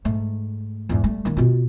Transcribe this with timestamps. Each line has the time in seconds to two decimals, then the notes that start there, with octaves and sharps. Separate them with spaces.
0.05 G#2 A3
0.89 E2 G#2
1.04 G3 A3
1.25 D#3 A#3
1.37 B2 F4